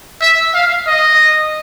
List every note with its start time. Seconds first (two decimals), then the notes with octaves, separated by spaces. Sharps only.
0.22 E5
0.54 F5
0.87 D#5